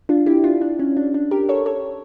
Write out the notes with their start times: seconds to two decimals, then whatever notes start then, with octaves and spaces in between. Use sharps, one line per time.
0.09 D4 F4
0.26 E4 G4
0.44 D4 F4
0.61 D4
0.79 C#4
0.97 D4
1.14 D4
1.31 G4 A#4
1.49 A4 C#5
1.66 A4 C#5